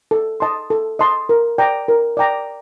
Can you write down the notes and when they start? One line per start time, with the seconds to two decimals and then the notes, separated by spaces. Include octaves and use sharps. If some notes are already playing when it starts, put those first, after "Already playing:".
0.11 A4
0.40 D#5 A5 C6
0.70 A4
0.99 D#5 A5 C6
1.29 A#4
1.58 D5 G5 A#5
1.88 A#4
2.17 D5 G5 A#5